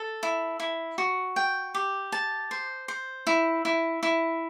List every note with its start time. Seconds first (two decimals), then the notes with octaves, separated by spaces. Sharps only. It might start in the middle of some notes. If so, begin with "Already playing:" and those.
Already playing: A4
0.23 E4
0.60 E4
0.98 F#4
1.36 G5
1.74 G4
2.12 A5
2.51 C5
2.88 C5
3.27 E4
3.65 E4
4.03 E4